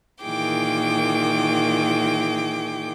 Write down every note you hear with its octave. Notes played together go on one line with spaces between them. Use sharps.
A#2 D#3 E3 G#4 G5 D6